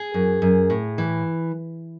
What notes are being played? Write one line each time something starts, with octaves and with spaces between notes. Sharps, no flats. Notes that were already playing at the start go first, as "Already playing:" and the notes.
Already playing: G#4
F#2
F#2
A2
E3